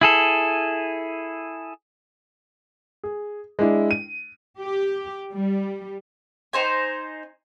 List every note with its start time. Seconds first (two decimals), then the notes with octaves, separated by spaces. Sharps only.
0.01 E4 G#4 A4
3.04 G#4
3.59 G#3 D4 E4
3.91 D#7
4.60 G4
5.32 G3
6.53 D#4 C5 G#5